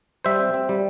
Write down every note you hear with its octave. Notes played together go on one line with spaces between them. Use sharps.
G3 C5 E5
C4
C4
G3